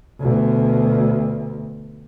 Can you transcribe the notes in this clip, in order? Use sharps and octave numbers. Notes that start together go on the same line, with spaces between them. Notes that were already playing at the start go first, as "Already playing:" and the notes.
D2 B2